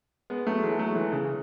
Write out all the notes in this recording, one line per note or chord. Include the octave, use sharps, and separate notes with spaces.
G#3 B3
F#3 A3
E3 G#3
F#3 A3
E3 G#3
C#3 E3